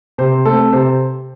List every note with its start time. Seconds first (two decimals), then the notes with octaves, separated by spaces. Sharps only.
0.18 C3 C5
0.45 A3 C4 A4
0.73 C3 C5